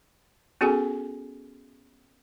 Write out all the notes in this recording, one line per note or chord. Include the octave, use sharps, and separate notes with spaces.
B3 C#4 F#4 G#4 A4 G#5